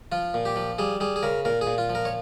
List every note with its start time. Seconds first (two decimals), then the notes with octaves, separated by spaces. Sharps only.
0.12 F3 F4
0.34 A#2
0.45 G4
0.56 F3
0.78 G3 G#4
1.00 G3 G#4
1.16 G#4
1.23 C#3 A#4
1.45 A#2 A#4
1.61 G#4
1.67 A#2
1.78 F4
1.90 F3
1.95 A#4
2.05 C#5